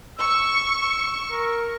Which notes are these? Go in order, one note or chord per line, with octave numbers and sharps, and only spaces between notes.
C#6 E6
E6
A#4